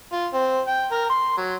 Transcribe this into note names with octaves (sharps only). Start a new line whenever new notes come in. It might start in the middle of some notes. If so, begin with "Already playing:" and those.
F4
C4
G5
A#4
C6
F#3